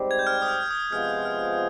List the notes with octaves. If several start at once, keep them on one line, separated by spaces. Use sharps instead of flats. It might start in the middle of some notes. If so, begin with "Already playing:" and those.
Already playing: G#2 G3 C4 G4 C5
G#6
G6
F6
D#6
F6
D#6
C3 F3 G#3 B3 F4 F6
F6